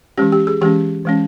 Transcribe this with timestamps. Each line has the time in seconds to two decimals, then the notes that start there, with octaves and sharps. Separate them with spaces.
0.18 E3 G#3 C#4 G4
0.32 G4
0.47 G#4
0.61 E3 G#3 C#4 G4
1.05 E3 G#3 C#4